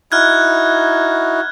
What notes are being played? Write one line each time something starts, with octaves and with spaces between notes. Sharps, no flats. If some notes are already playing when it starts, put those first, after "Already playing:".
D#4 E4 F#4 F6 F#6 G#6